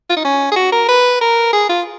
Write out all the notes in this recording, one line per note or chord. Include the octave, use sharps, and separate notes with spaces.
F4
D#4
C#4
G#4
F#4
A#4
B4
A#4
G#4
F4